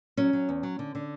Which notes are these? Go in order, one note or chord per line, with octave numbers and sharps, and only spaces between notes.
F#3 C#4
F#3
E2
F#3
D3
D3